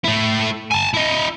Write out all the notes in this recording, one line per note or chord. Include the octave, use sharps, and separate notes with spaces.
A3 E4
G#5 A5
E4 D#5